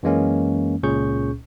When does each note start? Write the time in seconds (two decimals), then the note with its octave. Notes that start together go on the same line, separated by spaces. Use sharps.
0.03 F#2 E3 G#3 A#3 C#4
0.83 C#2 A#2 C#4 G#4 C#6 G6